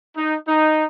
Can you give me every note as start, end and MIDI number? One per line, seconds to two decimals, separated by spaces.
0.16 0.34 63
0.46 0.85 63